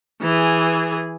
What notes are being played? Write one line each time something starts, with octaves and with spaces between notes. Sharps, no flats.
E3 G#4